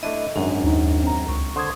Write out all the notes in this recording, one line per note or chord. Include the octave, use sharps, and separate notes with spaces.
A3 D4 E4 D#5
G#1 F#2 D4
D#2 D#4
C4 A#5
C#2 C#6
D3 C5 C6 D#6 G#6